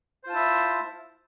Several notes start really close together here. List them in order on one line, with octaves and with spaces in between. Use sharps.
C5 F4 A5 E4 E5